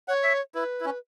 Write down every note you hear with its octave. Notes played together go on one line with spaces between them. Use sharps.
C#5 F#5
E5
E4 B4
E4
C#4